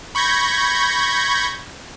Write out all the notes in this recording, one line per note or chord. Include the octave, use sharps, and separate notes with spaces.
B5 C#6 G6 G#6 A#6